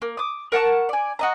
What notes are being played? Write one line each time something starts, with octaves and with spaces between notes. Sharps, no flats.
A#3
D6 D#6
A#4 F#5 A5 C#6
D5 G#5
F#4 D#5 A#5